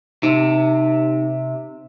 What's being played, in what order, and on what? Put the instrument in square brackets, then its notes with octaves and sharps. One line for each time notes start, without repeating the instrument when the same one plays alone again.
[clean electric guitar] C3 [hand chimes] D#4